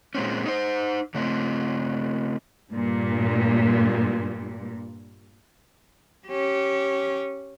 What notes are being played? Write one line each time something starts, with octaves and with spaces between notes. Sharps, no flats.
A#2 G#3 C4 C#4
D#4 C5
C#3 A3 C4
G2 A#2
C#4 G4